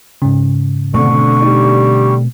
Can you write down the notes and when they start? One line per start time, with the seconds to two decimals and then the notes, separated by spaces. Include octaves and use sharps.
0.22 G#2 C#3
0.94 B2 D3 A3 C4 C#6
1.42 D3 G3 D#4 G4